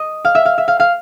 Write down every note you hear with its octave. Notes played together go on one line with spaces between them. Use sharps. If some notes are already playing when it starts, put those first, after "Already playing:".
Already playing: D#5
F5
E5
F5
E5
F5
F5